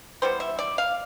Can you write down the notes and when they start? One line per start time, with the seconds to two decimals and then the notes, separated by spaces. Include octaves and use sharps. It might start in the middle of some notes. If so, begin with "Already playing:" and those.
0.22 E3 G3 B3 C5
0.40 E5
0.59 D5
0.78 F5